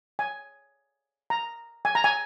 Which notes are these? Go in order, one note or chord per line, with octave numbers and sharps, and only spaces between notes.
G#5
A#5
G#5
A#5
G#5